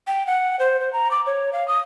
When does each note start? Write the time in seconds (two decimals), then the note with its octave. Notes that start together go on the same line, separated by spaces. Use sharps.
0.07 G5
0.27 F#5
0.59 C5
0.80 C5
0.93 A#5
1.11 D6
1.26 C#5
1.53 F5
1.68 D#6